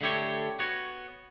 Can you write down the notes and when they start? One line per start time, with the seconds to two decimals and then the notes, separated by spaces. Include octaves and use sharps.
0.01 D3 A3 E4 G4 C#5
0.59 B3 F#4 C#5